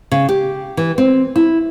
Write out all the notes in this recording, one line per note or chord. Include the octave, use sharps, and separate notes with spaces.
C#3
G4
E3
C4
E4